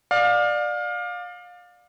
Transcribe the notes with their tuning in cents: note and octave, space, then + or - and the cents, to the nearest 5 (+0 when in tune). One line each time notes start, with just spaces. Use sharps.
D5 +20 F5 +25